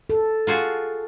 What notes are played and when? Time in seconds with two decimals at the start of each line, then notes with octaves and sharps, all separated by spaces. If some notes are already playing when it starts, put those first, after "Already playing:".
0.10 A4
0.47 F4 F#4 G#4